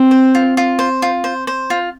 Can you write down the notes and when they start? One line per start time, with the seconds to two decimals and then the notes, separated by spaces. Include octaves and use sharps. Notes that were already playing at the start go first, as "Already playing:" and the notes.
Already playing: C4
0.11 C5
0.35 F4
0.57 F4
0.79 C5
1.02 F4
1.24 C5
1.47 C5
1.70 F4